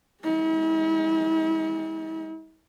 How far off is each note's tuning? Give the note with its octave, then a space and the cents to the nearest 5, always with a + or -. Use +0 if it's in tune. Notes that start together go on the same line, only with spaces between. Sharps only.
G#3 -35 E4 -45